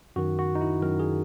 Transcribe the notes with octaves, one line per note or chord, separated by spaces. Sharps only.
F#2 D#3 F#4
F#4
D#4
E4
F#2 D#3 A#4
G#4